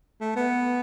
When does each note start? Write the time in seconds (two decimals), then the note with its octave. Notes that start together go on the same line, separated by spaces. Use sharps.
0.21 A3
0.36 B3